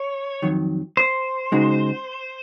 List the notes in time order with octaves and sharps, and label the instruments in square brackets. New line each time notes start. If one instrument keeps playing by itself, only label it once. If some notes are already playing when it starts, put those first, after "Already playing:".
Already playing: [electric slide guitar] C#5
[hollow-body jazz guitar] F2 D#3 F#3
[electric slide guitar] C5
[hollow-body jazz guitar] C#3 G#3 D#4 F#4